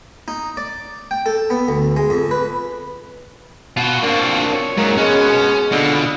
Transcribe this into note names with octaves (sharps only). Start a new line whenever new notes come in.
D#4
D5
G5
A4
B3
D2
G#3
F2
B4
B2 F4 F#4
A#3 C4 D4
C#5
G#2 F#3 A#3 C#4
G#3 B3 C#4 F#4
B2 D3 F4 B5